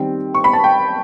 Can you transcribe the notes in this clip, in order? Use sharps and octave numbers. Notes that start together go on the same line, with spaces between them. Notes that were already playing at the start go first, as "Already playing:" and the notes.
Already playing: D#3 G3 C4
C#6
B5
A5
G5